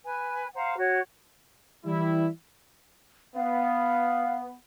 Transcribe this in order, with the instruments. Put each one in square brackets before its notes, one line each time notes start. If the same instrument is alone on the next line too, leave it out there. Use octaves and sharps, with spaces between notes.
[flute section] B4 G#5
C5 F5 F#5 A#5
F#4 C#5
[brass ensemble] E3 G3 E4
[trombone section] B3 [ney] F5